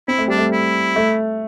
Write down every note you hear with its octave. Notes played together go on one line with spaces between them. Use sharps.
C4 E4
A3
G3 D4
A3
E4
A3